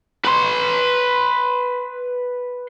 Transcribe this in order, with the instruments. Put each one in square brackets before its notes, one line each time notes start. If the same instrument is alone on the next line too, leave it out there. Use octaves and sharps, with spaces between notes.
[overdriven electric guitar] B4 C6